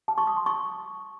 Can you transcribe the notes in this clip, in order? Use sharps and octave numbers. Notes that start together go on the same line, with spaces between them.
A5
C#6
D#6
C6
C#6